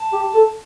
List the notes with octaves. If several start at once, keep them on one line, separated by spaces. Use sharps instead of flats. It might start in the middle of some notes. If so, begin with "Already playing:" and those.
Already playing: A5
G4
A4